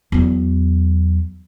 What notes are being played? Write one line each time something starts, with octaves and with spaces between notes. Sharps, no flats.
E2 F#3